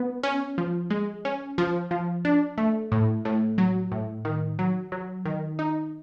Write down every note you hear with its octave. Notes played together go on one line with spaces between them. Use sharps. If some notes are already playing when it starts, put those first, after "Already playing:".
Already playing: B3
C#4
F3
G#3
C#4
F3
F3
D4
A3
A2
A2
F#3
A2
D#3
F#3
F#3
D#3
D#4